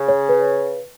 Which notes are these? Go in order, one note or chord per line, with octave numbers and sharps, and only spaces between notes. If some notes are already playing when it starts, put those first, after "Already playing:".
Already playing: C#3
C#5
B4